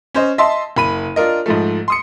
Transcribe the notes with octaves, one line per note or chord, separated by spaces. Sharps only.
C#4 C5 D#5
D#5 E5 A5 C6
F#1 B5 D#7
D4 F4 A#4 D#5
G#2 F3 A3
C6 D#6 C#7